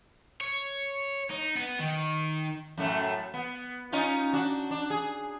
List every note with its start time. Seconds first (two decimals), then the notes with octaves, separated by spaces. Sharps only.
0.41 C#5
1.30 D#4
1.56 B3
1.79 D#3
2.78 F#2 A2 A3
3.34 B3
3.92 C#4 D#4 F4
4.33 D4 F#4
4.71 D4
4.90 G#4